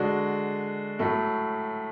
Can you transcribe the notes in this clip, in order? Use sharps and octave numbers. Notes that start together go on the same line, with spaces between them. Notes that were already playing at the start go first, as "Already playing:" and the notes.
Already playing: D3 G#3 D4 F#4
A2 F#3 A3